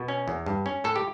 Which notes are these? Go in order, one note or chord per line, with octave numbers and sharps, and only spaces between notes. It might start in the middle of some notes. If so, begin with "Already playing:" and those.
Already playing: B2 F#4
C#4
E2
G2
C#4
A2 A4
G4